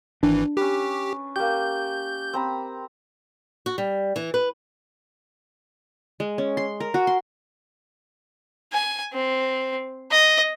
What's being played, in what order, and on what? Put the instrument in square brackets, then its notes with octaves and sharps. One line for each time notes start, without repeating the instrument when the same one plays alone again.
[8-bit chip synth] G#1 E3 [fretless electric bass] D4
[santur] C#4 B4 [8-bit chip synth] G4
[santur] A#3 G4 [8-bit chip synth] G6
[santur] C4 A#5 B5
[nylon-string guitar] F#4
G3
E3
B4
[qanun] G#3
C#4
C6
A#4
F#4
C6
[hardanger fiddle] G#5
C4
D#5